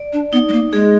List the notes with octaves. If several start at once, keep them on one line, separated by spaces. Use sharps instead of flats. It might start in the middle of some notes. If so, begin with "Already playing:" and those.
Already playing: D5
D4
B3 D#4
G#3
A#3
G#3 G#4